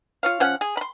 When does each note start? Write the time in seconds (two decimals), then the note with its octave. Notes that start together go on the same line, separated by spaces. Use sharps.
0.23 F4 C#5 F5
0.40 F3 C#4 F#5
0.61 G#4
0.77 B5 C6